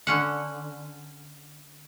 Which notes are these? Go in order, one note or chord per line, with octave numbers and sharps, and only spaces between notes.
D3 C#4 F#5